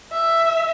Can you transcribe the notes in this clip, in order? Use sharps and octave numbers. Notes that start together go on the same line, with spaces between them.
E5